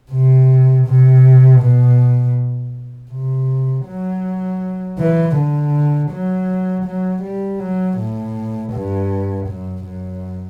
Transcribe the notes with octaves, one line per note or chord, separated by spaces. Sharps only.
C3
C3
B2
C3
F#3
E3
D3
F#3
F#3
G3
F#3
A2
G2
F#2
F#2